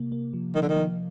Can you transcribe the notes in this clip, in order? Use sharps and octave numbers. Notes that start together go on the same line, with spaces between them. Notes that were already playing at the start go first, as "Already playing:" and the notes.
Already playing: C3 A#3
A#3
F3
D#3 F3
D3
D#3
F3